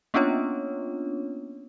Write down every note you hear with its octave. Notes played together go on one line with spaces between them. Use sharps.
A#3 B3 C#4 D4 F4 C#5